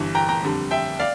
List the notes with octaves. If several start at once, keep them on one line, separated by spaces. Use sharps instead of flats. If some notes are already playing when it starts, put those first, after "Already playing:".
Already playing: G1 G2 E3
G5 A#5
G5 A#5
F2 D3 G3
E5 G5
D5 F5